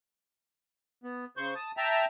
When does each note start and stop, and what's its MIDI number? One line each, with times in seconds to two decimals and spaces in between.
1.04 1.25 59
1.37 1.54 49
1.37 1.54 72
1.37 1.54 85
1.37 1.54 91
1.55 1.72 81
1.55 1.72 87
1.77 2.05 76
1.77 2.05 79
1.77 2.05 81
1.77 2.05 82